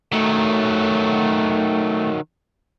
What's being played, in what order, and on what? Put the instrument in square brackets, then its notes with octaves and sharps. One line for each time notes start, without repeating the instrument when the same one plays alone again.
[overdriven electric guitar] D#3 F#3 [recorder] A3